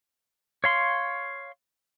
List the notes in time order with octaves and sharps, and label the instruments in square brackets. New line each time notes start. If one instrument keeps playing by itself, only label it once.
[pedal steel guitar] C#5 F5 C6